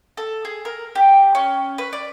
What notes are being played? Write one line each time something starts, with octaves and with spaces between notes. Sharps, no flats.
A4
G#4
A#4
G4
C#4
B4
D5